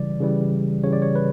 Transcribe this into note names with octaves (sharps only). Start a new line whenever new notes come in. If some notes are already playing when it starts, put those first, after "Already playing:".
Already playing: C#3 E3 G3 D5
C#3 E3 G3
C#3 E3 G3 C#5
D5
C#5
B4